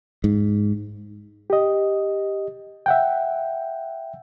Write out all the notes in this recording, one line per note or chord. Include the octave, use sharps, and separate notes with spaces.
G#2
G4 D#5
E5 F#5 G5